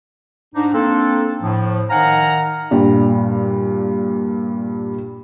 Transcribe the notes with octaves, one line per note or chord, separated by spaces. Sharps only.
G#2 D4 D#4
A#3 C4 D4 A4
A2 F3
D#3 D#4 F5 F#5 G#5 A#5
G2 A#2 G3